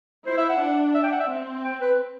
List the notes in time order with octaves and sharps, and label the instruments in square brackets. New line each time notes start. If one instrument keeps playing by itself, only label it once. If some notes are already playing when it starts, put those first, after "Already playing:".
[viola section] E4 [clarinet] C5
[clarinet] E5
F#5
[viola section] D4
[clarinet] E5
G5
F#5
E5
[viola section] C4
[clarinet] G5
B4